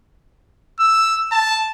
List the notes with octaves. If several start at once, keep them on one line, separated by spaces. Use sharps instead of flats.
E6
A5